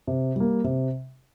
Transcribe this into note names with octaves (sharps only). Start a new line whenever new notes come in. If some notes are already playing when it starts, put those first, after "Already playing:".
C3
G3 A#3
C3